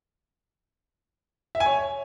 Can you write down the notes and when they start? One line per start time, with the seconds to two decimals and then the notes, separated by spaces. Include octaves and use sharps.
1.55 E5
1.60 G#5
1.66 C#5